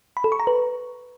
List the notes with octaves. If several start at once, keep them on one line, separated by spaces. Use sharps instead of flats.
B5
A4
C#6
A#5
B4